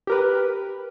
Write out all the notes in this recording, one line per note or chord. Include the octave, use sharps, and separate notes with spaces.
G4 A#4 B4